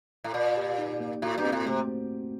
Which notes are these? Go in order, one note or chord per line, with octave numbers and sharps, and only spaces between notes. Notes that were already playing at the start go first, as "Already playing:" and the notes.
A2
A#2 D5
G4
D#4
A#3
A2 F#4
G2
C4
A2
C3 A3